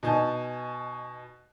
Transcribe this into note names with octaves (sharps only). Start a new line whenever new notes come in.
B2 D#4 G#5 A5 G6